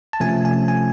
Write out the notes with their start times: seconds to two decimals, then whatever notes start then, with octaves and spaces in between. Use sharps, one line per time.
0.13 A5
0.20 C3 F3 A3 C#4 G#5
0.45 G#5
0.68 G#5